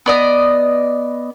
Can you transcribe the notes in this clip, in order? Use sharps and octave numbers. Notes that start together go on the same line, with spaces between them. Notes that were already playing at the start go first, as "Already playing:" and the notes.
B3 D5 D#5